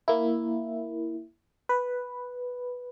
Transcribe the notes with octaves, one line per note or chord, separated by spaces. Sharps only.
A#3 E4
B4